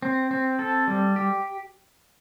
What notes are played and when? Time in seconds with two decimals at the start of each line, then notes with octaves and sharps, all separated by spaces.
0.02 C4
0.31 C4
0.59 A4
0.88 G3
1.16 G4